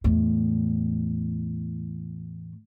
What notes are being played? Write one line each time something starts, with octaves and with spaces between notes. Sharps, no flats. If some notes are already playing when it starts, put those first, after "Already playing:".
E2 A2